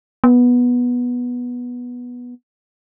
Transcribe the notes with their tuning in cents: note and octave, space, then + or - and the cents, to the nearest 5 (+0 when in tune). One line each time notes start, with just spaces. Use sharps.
B3 -10